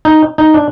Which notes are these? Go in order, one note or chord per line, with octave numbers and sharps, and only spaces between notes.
D#4
D#4
D4